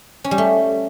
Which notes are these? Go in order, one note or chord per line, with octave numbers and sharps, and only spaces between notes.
C#4
G3
A3